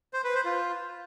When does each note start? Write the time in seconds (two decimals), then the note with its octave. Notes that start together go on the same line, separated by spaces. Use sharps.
0.14 C5
0.24 B4
0.35 C5
0.45 F4